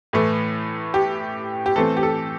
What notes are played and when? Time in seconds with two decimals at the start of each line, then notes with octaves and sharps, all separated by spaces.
0.13 A2 E3 A3
0.94 G4
1.66 G4
1.76 E3 A3 C4 A4
1.97 G4
2.03 A4